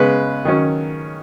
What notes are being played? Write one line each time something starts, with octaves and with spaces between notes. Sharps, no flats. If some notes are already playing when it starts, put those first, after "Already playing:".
Already playing: C#3 G#3 B3 B4
D#3 F#3 C#4